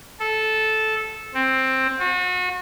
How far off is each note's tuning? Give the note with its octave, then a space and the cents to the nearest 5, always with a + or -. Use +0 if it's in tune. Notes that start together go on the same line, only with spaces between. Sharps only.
A4 -10
C4 +10
F#4 -35